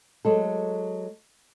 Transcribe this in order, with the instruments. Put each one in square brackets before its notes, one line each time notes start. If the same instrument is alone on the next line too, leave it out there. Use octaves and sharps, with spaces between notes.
[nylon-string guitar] F#3 G#3 A4